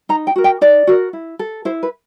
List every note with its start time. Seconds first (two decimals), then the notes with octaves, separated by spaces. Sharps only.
0.09 D#4 A#5
0.27 G5
0.36 F#4 A#4
0.44 G5
0.61 D#4 D5
0.87 F#4 A#4
1.13 E4
1.39 A4
1.65 E4 C5
1.83 B4